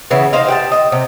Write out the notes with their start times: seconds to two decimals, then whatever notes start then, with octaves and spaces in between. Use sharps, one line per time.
0.11 C#3 E3 B3
0.33 D#4 C5 D#5 F5
0.48 G4 F#5 A5
0.72 D#5
0.92 C3